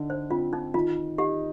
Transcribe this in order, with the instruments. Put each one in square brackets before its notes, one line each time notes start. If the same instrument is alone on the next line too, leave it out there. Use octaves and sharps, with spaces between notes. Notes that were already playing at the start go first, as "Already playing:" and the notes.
Already playing: [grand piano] D3 D#4
[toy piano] C5
[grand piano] C4 [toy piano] F4
[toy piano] D#4
[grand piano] D#3 [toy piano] F4
[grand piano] D#4 [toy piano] G4